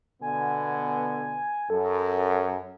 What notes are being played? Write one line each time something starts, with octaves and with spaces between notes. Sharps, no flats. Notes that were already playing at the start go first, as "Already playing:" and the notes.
B2 D3 B3 G#5
F#2 A4